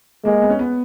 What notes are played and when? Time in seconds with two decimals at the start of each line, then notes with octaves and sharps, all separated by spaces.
0.24 G#3 A#3
0.42 B3
0.50 C#4
0.59 B3